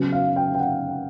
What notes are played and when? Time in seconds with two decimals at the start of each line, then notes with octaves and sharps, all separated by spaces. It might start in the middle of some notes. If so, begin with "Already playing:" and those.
Already playing: C#3 F#3 B3
0.12 F5
0.36 G5
0.55 G5
0.60 F#5